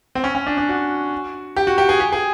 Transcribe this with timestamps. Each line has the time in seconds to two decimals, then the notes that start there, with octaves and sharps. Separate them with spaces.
0.15 C4
0.24 C#4
0.35 C#4
0.47 D4
0.58 D4
0.69 F#4
1.56 G4
1.67 F#4
1.78 G4
1.89 G#4
2.00 G4
2.12 G#4